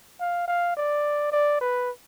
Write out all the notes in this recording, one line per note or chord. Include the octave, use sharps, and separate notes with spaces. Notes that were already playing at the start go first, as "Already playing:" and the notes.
F5
F5
D5
D5
B4